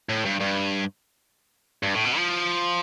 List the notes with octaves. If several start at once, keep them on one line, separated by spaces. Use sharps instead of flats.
A2
G2
G2
G2
A2
B2
F3